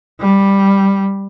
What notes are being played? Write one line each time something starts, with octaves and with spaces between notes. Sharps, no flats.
G3